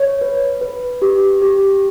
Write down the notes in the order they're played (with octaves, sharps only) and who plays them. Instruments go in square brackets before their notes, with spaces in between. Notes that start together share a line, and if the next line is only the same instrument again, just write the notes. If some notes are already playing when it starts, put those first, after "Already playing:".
Already playing: [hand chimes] C#5
B4
B4
G4
G4